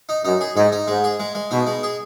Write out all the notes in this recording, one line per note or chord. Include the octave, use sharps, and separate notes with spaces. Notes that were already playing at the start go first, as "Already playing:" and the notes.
D#4
F#2 D#4
G#4
G#2 D#4
D#4
G#2 G#3
G#4
G#3
G#3
B2 D#4
G#3
G#4